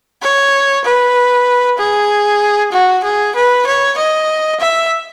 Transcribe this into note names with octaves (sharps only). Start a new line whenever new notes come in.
C#5
B4
G#4
F#4
G#4
B4
C#5
D#5
E5